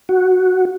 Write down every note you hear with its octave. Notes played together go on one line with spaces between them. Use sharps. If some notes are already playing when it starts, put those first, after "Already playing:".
F#4